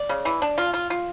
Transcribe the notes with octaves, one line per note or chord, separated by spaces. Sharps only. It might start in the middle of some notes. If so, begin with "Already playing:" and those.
Already playing: D5
C#3
E3
D4
F4
F4
F4